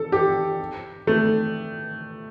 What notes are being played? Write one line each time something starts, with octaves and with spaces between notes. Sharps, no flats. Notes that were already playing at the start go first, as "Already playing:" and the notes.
Already playing: A4
G4
A3